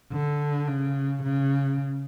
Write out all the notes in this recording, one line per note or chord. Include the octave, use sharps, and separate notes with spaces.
D3
C#3
C#3